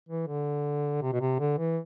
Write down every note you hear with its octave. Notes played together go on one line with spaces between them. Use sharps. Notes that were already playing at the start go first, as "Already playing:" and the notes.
E3
D3
C3
B2
C3
D3
E3